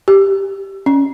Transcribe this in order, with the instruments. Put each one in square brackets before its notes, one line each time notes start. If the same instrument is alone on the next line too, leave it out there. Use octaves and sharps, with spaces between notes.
[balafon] G4
C#4